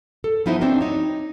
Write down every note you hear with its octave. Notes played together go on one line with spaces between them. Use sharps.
A4
F3 B3 D#4 E4 F#4 C5
C4 D4 D#4 F#4
D#4 C#5